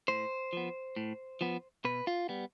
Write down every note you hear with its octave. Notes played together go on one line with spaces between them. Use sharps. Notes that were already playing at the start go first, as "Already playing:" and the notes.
A2 C5
F3 B3
A2
F3 B3
B2 B4
F4
G3 B3